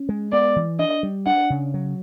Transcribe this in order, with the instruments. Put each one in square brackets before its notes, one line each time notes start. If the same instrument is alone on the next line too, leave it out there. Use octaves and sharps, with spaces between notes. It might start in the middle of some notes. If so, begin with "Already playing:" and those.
Already playing: [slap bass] C#4
G#3
[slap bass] B3 [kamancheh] D5
[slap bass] E3
[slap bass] D4 [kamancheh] D#5
[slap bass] G3
[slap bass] D4 [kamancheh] F#5
[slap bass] C#3
F#3